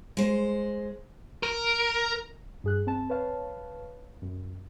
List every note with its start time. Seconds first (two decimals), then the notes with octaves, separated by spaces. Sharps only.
0.17 G#3 C5
1.43 A#4
2.64 G2 G#4 F#6
2.87 C4 A5
3.10 B4 C#5 F5 A5
4.22 F#2